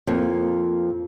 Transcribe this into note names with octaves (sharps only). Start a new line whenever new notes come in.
F2 A#3